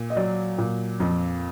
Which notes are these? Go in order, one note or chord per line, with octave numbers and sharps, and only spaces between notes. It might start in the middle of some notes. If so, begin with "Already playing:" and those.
Already playing: A#2
D#5
F#3 D5
A#2
F2